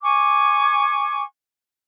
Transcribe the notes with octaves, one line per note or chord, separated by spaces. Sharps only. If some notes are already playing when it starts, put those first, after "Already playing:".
G#5 C#6 D6